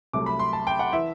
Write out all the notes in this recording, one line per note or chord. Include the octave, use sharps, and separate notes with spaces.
C2 C3 F#3 A3 D6
B5
C6
A5
G5
F#5
E3 E5